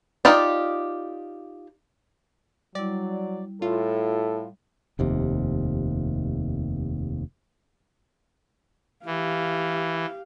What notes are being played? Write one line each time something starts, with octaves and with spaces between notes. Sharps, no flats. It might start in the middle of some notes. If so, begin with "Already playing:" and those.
D#4 F4 G4 D5
F#3 G3 E4 D5
A2 F4 A4
F1 D#2 C3
E3 G4 F5